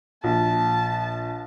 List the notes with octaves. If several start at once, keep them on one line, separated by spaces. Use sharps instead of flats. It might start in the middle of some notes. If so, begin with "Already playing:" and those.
A#1 A5